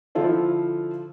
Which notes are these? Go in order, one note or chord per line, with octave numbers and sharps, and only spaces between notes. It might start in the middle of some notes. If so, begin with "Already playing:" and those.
D3 F3 E4 F4 A4 C5